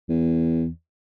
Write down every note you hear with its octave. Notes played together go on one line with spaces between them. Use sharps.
E2